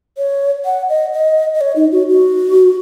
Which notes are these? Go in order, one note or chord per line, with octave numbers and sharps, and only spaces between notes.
C#5
F#5
D#5
D#5
D#5
C#5
D#4
F#4
F#4